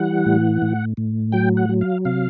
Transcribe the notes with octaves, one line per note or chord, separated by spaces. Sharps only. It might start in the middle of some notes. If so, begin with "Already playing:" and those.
Already playing: E3 G3 F#5
A2
A2
A2
F#3 G5
F#5
F#3
F5
C3 F5